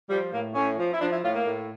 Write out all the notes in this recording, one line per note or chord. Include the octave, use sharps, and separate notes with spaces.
F3 G3
A2 A#3
A2 C#4
F3
E4
F3 D4
E4
A2 F4
A#3
A2